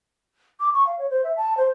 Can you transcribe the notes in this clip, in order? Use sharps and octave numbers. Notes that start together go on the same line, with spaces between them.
D6
C#6
F5
C#5
C5
E5
A5
C5